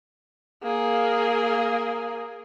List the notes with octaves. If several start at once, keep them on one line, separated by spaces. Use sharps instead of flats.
A#3 G#4